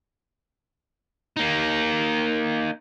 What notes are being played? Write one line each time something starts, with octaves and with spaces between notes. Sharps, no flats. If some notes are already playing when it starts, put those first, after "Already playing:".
A#3 D#4